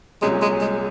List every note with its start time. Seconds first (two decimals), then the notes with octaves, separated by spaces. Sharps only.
0.22 C2 A#2 F#3 G#3 C#4
0.42 G#3
0.61 G#3